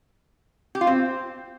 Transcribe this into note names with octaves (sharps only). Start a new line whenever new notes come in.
G4
F4
C4